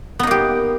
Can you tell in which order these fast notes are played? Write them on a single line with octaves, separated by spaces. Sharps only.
B3 D#4 A#3 G4